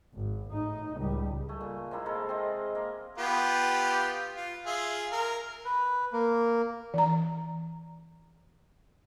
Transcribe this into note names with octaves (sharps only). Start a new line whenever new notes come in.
G#1
A2 D#4
C#2 G3
A3 G#5
A#2
C3 G#3 A#3 E4
G#3 A4 A#4
C4 G#4 D#5
A#3 A#4
B3 F4 G4
F4
F4 G#4 E5
A#4
B4
A#3
E3 A#5